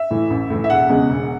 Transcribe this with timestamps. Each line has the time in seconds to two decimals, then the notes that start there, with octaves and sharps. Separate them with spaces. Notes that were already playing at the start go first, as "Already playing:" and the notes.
Already playing: E5
0.11 A2 E3
0.30 A1
0.50 A2 E3
0.64 E5
0.70 E1 F#5
0.89 E2 C#3 G#3
1.10 E1